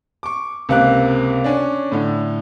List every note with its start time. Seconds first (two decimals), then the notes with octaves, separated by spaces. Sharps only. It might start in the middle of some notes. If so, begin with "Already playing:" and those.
0.23 C#6 D6
0.69 C#2 C3 A#3 F#6
1.44 C#4 D4
1.92 A2 D3